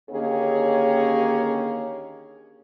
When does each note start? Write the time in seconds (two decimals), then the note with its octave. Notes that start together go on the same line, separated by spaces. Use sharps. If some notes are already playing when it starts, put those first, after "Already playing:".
0.11 D#2 D3 A#3 C#4 G4 G#4